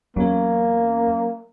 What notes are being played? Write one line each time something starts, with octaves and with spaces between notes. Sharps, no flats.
E2 F#3 A#3 C#4